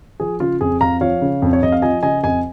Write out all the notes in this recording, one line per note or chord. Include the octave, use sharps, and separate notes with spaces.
F3 G#4
C#3 F4
F2 G#4
F2 F5 A#5
F3 C#5 F5
C#3
F2
C#5
F2 D#5
F5
F3 D#5 G#5
C#3 D#5 G#5
F2 D#5 G#5